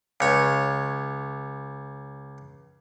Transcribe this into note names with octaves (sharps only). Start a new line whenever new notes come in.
C#2 C#5